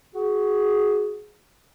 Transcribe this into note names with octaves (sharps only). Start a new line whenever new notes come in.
F#4 G#4